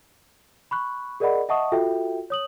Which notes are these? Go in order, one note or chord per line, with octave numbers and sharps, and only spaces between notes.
B5 C#6 F#6
G#4 A#4 D5 D#5 F#5 B5
D#5 E5 F#5 A5 C#6 D#6
F4 F#4 A4 E5 G5
C#5 D#6 F#7